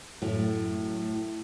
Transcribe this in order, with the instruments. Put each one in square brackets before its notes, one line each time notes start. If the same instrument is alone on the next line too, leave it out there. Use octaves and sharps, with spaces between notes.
[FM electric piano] F#2 F#3 A3 [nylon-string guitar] A2